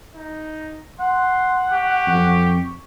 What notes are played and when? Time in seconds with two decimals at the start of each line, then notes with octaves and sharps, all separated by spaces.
0.15 D#4
1.00 F#5 C6
1.72 G4 C#6
2.07 F2